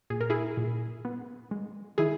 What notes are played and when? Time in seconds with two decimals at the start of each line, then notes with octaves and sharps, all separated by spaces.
0.10 A#2 G#4
0.21 A#4
0.30 E4 G#4
0.57 A#2
1.05 B3
1.51 G#3
1.98 D#3 E4 G#4